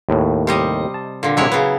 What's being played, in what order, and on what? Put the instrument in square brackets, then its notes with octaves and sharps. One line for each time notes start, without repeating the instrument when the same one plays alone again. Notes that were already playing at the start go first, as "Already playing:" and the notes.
[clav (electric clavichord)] D#2 A2
[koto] C3 G3 D#5
[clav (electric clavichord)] A5
[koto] A#2 D3
[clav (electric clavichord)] C3 G#3 D4 [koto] F#3 E4 C#5
[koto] C#3 B3 [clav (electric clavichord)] B4